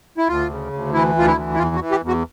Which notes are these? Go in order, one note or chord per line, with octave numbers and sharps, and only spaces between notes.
E4
D2 F4
C#3
D2
E3 E4
D2 F4
E4
E3
E4
E2 F4
F#4
E3
G4
E2
F#4